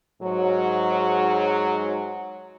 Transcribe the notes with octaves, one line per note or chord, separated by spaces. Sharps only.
G#2 F#3